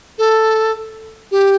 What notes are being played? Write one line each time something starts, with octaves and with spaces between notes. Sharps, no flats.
A4
G4